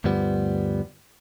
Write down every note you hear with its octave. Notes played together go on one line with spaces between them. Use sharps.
D2 G2 F3 G3 B3